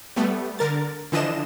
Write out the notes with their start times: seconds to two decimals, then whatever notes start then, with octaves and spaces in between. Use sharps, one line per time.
0.16 G3 A3 B3
0.59 D3 A#4 A6
1.12 D3 E3 F3 D4 D#5 E7